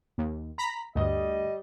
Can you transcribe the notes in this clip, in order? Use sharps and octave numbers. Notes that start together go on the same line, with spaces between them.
D#2
A#5 B5 B6
D2 G2 G3 D#5